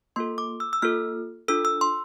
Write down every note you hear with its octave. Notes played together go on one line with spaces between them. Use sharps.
A#3 F4 A4 C6
D6
E6
E6
A#3 F4 A4 F6
D4 F4 A4 E6
E6
C6